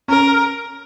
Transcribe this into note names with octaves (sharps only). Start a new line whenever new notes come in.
C#4 A#4